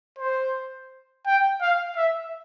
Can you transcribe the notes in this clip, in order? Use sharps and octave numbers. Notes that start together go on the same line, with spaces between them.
C5
G5
F5
E5